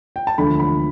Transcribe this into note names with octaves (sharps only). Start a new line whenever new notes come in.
G5
A5
E1 D2 D3 F3 B5
B5